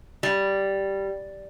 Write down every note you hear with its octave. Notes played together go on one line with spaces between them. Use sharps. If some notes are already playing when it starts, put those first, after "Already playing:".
G3